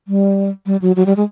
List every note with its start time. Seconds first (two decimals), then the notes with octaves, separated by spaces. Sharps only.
0.08 G3
0.66 G3
0.82 F#3
0.96 F#3
1.06 G3
1.17 G#3